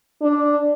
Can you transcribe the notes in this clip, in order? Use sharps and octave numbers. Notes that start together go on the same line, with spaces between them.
D4